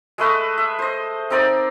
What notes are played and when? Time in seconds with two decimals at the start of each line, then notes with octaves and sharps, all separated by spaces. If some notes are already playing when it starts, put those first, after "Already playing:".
0.18 G#3 A3 B4 D#5
0.58 E5
0.79 C5 D#5
1.30 C4 D#4 A#4 D5